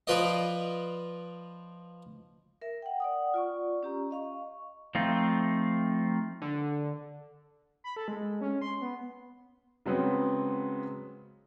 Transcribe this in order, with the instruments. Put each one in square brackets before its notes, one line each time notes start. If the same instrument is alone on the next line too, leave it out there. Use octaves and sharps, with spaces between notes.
[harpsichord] F3 F4 B4 D5 D#5
[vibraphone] A#4 E5
F#5 G5
D5 F#5 D#6
F4 D5 C#6
C#4 G4 A#5
D#5 F5 C#6
[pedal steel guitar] F3 A3 C4 D#4 F4
[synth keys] D3
[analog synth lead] B5
A4
G#3
C#4
C6
B3
[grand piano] C#3 F#3 G#3 B3 C4